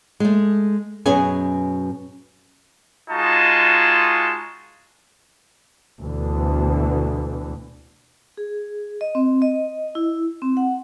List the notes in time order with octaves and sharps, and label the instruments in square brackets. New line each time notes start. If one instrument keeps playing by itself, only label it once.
[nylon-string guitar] G#3 A3
F#2 B2 B3 C#4 G#4 G#5
[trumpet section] G#3 D#4 F4 F#4 A5
[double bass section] D2 B2 D3 E3
[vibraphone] G#4
D#5
C4
D#5
E4
C4
F#5